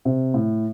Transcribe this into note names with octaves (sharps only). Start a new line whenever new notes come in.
C3
A2